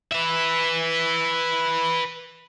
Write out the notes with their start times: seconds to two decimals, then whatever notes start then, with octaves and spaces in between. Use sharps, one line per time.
0.12 B4 E5